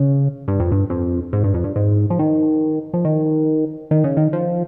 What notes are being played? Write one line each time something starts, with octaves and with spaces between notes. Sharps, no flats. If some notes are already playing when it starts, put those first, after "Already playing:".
Already playing: C#3
G2
F2
G2
F2
G#2
G2
F2
G2
G#2
F3
D#3
F3
D#3
D#3
C#3
D#3
F3